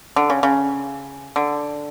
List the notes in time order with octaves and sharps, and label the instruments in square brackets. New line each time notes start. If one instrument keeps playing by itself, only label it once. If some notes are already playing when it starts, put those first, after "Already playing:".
[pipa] D3
C#3
C#3
D3